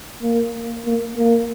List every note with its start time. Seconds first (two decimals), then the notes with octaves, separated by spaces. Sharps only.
0.22 A#3
0.85 A#3
1.17 A#3